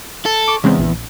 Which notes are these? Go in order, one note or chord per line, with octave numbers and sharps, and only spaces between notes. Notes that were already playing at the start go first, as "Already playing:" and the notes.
A4
C#6 D6
E2 C#3 G#3 C4
A#1